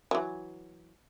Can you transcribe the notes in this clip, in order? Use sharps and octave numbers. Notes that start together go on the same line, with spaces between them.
E3 F#3